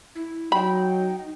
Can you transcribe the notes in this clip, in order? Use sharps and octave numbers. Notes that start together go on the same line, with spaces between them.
E4
F#3 D#4 G5 B5